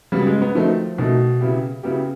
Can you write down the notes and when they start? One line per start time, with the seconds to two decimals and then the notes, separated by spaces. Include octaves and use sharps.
0.12 C#3 F#3 G3 B3
0.27 G#3
0.42 B3
0.55 D#3 F3 F#3 A3
0.98 B2 D#3 F#3 A3
1.40 C#3 F#3 B3 E4 G4
1.83 C#3 F#3 B3 E4 G4